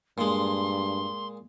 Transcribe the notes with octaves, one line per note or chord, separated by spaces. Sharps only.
G2 A#2 G#3 C6